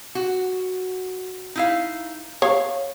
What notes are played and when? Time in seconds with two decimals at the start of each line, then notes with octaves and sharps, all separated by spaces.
0.15 F#4
1.56 D#4 E4 F5
2.42 C#5 F5